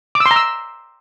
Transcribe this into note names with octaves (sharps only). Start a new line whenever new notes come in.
D6
E6
C6
A#5
E6